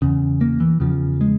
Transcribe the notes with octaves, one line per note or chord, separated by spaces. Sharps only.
E2 C#3
A#3
E3
E2 C#3 F3
G#3